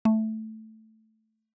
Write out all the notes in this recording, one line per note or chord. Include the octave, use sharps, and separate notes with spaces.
A3